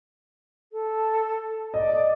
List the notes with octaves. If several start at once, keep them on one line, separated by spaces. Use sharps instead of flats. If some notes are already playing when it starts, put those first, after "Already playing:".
A4
D5 D#5